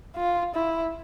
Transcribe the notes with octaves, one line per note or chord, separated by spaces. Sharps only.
F4
E4